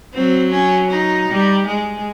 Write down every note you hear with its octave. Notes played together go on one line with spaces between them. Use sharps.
F#3 C4
C#4
D#4
G3
G#3